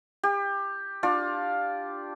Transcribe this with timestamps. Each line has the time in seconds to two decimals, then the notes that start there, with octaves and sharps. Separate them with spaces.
0.23 G4
1.03 D4 F4 D5